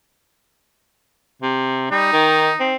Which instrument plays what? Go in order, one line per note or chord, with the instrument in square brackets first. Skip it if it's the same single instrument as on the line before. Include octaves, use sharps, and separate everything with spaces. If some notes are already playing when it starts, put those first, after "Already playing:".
[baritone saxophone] C3
[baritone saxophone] G3 [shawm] D#4
[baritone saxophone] D#3
C4